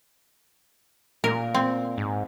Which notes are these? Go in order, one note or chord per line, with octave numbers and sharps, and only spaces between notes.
A#2 A#4
C4
G#2